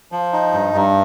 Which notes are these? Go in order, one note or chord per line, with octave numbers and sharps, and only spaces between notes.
F3
D#4
G2
G2